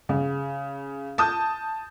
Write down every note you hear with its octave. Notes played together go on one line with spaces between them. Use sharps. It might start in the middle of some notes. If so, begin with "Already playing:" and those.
C#3
A5 D#6 G6